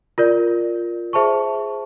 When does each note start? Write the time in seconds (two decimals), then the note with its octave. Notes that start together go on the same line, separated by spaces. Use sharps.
0.18 F4 A#4 D5
1.13 G#4 C5 E5 A5 C#6